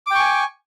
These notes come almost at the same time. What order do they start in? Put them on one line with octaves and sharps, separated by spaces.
D6 G5 C#6 G#5